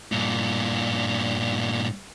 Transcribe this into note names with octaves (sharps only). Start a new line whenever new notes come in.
G2 A#2